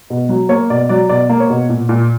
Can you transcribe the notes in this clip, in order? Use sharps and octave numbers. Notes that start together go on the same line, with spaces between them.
B2
F#3
A#3 C#5
B2 D5
F#3 D5
B2 D5
A#3
C#5
B2
A#2
A#2